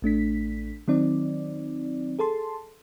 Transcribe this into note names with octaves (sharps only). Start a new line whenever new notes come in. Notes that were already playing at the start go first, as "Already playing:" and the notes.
A1 A3 D4 B6
D#3 F#3 C4 D#4 D5
G#4 A4 A5 C6